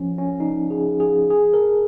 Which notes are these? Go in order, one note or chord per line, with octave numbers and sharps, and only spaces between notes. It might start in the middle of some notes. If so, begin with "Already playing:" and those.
Already playing: F3 C#4
C#4
D#4
G#4
G#4
G#4
A#4